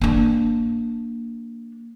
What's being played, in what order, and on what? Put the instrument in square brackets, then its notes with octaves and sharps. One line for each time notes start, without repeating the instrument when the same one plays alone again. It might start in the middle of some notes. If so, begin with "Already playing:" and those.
[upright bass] A#3 D4